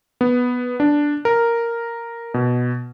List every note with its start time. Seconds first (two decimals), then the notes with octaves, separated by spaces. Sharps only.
0.21 B3
0.80 D4
1.25 A#4
2.34 B2